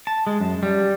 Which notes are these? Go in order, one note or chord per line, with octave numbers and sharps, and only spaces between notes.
A5
G#3
F#2
G3